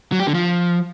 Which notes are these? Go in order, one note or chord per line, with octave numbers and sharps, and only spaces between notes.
F#3
G4
D3
F3